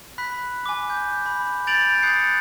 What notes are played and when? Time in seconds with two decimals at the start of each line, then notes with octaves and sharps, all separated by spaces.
0.18 B5 F#6 B6
0.66 G#5 D6
0.90 G6
1.26 B5
1.67 G6 A6 D7 F7 F#7
2.02 D#6 F#6 G6 A6 C7 C#7